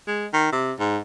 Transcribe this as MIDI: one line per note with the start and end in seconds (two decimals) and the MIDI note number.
0.07 0.26 56
0.33 0.50 51
0.52 0.73 48
0.79 0.98 44